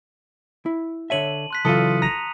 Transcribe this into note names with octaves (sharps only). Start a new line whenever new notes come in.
E4
D3 C#5 E5 A5 D#7 F#7
C6 F#6 B6
C#3 E3 F#3 F4 A4 D#6 C#7 D#7
A#5 A#6 D#7 F7